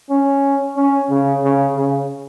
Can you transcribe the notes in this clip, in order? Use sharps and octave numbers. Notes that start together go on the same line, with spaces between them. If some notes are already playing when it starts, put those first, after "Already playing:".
C#4
C#4
C#3
C#3
C#3